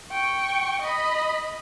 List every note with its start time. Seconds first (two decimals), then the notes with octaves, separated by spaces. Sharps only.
0.11 G5 C#6
0.82 D#5 B5